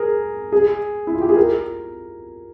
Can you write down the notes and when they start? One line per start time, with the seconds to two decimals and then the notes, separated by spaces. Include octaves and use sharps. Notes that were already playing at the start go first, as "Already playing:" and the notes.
Already playing: G#4 A#4
0.52 G#4
1.07 E4
1.15 F4
1.22 G4
1.29 G#4
1.36 A#4